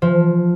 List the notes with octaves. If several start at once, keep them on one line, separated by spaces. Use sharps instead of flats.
F3